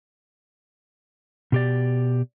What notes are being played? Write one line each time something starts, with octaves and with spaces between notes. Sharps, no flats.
B2 G4 D5